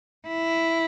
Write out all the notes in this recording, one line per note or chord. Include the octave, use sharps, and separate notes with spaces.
E4